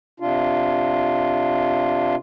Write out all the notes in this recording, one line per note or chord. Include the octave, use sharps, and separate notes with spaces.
C3 D4 F4